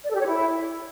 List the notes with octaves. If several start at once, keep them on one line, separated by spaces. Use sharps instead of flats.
D5
A4
G4
C#5
E4